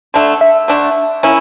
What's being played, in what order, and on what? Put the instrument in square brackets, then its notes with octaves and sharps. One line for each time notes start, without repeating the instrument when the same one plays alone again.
[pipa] D3 A3 D4
[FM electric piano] E5
[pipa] D3 A3 D4
A#3 C#4 E4